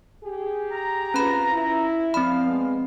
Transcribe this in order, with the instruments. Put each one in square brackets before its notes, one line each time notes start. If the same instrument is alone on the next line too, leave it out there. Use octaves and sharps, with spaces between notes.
[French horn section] G4 G#4
[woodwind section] A#5
[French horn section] C4 F4 B4 [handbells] C#4 B5
[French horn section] E4
[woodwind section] F3 D5 F5 [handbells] C4 B5
[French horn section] G#3 B3